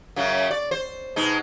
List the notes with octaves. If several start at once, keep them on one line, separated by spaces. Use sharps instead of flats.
F#2 C#3 F#3
D5
C5
B2 G#3 D#4